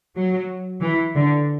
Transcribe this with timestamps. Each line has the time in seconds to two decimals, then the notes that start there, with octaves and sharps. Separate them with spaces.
0.16 F#3
0.82 E3
1.16 D3